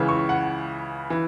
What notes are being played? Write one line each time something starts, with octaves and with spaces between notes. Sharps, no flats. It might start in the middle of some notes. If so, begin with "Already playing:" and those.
Already playing: C#2 C#3 E3
C#6
F#5
E3